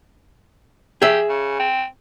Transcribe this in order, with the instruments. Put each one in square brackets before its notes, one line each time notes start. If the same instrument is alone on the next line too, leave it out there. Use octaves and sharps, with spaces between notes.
[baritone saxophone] G4 [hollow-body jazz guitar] G#4 E5
[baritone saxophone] C#3
C4